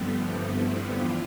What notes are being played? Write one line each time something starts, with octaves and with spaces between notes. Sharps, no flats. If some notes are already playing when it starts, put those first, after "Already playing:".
Already playing: G2 D3 F3 G3 A3 B3 C4
A3 C4
C4 E4
E2 D4 F4